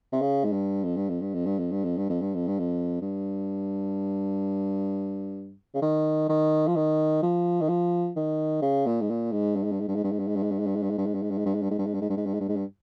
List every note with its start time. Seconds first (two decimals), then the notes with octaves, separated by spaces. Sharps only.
0.12 C3
0.22 C#3
0.44 G#2
0.53 G2
0.84 F2
0.96 G2
1.09 F2
1.21 G2
1.34 F2
1.46 G2
1.58 F2
1.71 G2
1.84 F2
1.97 G2
2.09 F2
2.21 G2
2.34 F2
2.47 G2
2.59 F2
3.02 G2
5.75 C#3
5.82 D#3
6.29 D#3
6.68 F3
6.76 D#3
7.23 F3
7.61 D#3
7.69 F3
8.16 D#3
8.62 C#3
8.86 A#2
9.01 G#2
9.10 A#2
9.32 G#2
9.56 G2
9.64 G#2
9.72 G2
9.80 G#2
9.88 G2
9.95 G#2
10.04 G2
10.12 G#2
10.19 G2
10.28 G#2
10.36 G2
10.43 G#2
10.51 G2
10.59 G#2
10.67 G2
10.76 G#2
10.83 G2
10.90 G#2
10.98 G2
11.06 G#2
11.14 G2
11.22 G#2
11.31 G2
11.38 G#2
11.46 G2
11.55 G#2
11.62 G2
11.71 G#2
11.78 G2
11.86 G#2
11.94 G2
12.01 G#2
12.10 G2
12.17 G#2
12.26 G2
12.34 G#2
12.41 G2
12.49 G#2
12.56 G2